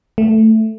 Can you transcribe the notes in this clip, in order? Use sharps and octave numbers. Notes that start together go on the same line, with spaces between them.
A3